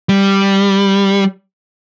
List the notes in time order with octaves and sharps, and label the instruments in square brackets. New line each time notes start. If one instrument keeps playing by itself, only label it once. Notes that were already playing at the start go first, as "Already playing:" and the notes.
[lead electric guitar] G3